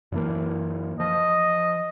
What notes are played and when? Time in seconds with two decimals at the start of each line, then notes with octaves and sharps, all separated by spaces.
0.12 F#2 E3 A#3
1.00 F3 D#5